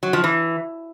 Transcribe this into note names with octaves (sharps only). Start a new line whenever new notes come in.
F#3
F3
E3